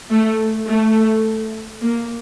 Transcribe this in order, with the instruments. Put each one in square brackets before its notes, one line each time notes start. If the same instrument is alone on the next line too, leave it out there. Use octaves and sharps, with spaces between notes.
[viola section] A3
A3
A#3